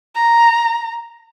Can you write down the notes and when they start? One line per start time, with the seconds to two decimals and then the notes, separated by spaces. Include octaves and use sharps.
0.15 A#5